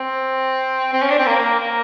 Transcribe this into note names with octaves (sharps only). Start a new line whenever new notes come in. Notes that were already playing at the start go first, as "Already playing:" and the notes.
Already playing: C4
C4
C#4
D4
C4
A#3
A#3